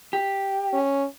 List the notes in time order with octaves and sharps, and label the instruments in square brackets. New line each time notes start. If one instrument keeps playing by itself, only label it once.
[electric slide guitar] G4
[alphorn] C#4